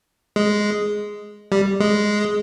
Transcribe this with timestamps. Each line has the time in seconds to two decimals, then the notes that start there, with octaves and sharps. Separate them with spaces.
0.36 G#3
1.52 G3
1.80 G#3